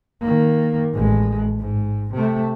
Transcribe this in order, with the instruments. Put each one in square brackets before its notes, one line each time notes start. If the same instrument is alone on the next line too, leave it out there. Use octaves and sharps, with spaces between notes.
[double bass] D#3 A#3
A1 G#3
G#2
C3 A3